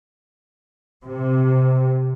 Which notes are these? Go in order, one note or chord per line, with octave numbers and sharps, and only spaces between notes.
C3